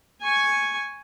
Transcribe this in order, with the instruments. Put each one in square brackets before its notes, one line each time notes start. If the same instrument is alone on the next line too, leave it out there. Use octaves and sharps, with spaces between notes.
[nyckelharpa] G#5 C#6